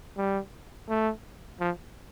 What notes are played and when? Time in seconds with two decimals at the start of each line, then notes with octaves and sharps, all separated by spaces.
0.17 G3
0.89 A3
1.60 F3